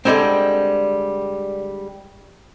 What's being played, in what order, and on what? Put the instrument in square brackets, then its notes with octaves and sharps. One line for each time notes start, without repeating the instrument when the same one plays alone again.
[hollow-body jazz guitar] D3 E3 G3 G#3 C4